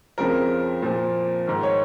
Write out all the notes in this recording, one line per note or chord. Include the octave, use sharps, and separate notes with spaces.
F2 C#3 F3 A#4
A#2 F3
G#2 D#3
C#5